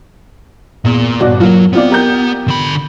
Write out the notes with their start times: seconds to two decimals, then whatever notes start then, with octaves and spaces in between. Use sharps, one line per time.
0.85 E2 A#2
1.20 G1 F#4 D5
1.40 F#3 A#3 F4
1.73 B3 C4 F4 D5
1.90 G4 A#4 G6
2.48 D3 B5